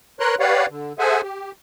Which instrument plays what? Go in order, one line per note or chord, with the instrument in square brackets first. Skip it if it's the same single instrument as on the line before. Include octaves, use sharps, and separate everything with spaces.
[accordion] A#4 B4 C#5 A#5 C6 F#6
G4 B4 C#5 D5 F5 F#5
D3
G#4 A4 C5 E5 F#5 G#5
G4